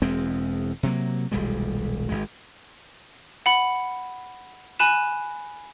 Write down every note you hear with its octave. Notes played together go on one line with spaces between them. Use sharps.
E1 E2 G#3 C4
C3 F#3 A#3
D#1 B1 G3 G#3
G#1 G#3
F#5 B5 C#7
G#5 B5 F#6 E7